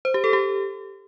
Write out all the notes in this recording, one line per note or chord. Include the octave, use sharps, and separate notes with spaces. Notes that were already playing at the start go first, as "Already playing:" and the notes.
C5
G4
A4
G4